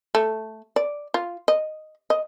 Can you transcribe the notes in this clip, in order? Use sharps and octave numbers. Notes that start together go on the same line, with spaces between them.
A3
D5
F4
D#5
D#5